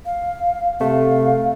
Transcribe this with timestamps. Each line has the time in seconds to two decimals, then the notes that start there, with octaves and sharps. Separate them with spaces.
0.05 F5
0.80 C3 A3 F5